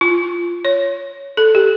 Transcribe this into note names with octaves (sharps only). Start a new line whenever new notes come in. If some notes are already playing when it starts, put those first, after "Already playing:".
F4
C#5
A4
G4